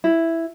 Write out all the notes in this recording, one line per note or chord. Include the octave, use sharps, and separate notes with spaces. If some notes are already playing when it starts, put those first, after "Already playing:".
E4